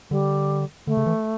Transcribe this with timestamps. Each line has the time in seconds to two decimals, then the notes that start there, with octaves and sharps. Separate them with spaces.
0.11 D3 G3
0.87 D3 A3
0.97 C#3
1.07 E3